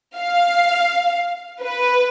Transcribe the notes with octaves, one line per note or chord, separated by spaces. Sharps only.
F5
B4